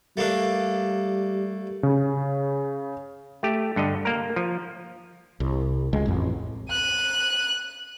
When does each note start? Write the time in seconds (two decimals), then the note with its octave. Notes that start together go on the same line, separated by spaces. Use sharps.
0.17 G3 A3 A#3 D4
1.83 C#3
3.43 A3 G4
3.76 G2 D3 D#5
4.05 A#3 A#4
4.36 F3
5.40 C2
5.93 C#2 G#3
6.06 A1 F2
6.70 F#6 D#7